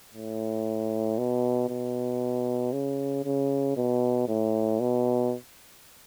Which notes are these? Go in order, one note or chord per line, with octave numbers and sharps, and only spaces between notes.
A2
B2
B2
C#3
C#3
B2
A2
B2